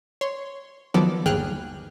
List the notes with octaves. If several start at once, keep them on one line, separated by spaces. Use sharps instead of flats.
C#5 C6
D#3 F3 F#3 B3 A4 D5
G1 D#2 G#4 G5 F6 F#6